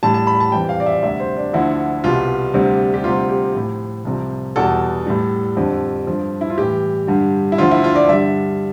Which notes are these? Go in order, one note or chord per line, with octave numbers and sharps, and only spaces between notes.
A2 G3 A5
A5
B5
A5
F2 E3 G3 G5
F5
D5
E5
D2 C3 G3 E5
C5
D4
D2 D3 F3 E4
C2 B2 G3 F4
D2 C3 G3
G4
D2 C3 G3 F4
G4
A2 F3
C2 C3 F3
E2 B2 G3 A4
A2 G3
F2 D3 G3
G2 F3
E4
F4
A2 E3 G3 G4
G2 D3 G3
E4
D2 D3 F3 F4
E4
F4
D5
G2 D3 G3 E5